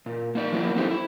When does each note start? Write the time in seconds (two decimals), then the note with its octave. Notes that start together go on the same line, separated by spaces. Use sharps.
0.06 A#2
0.35 A#3 D#4 D5
0.52 F3 F#3 A#3 E4
0.76 A#3 C4 D#4 G4 A4 C5
0.91 E4